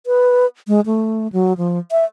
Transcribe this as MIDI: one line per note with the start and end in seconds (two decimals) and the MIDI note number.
0.07 0.46 71
0.68 0.80 56
0.86 1.28 57
1.33 1.53 54
1.57 1.79 53
1.92 2.05 76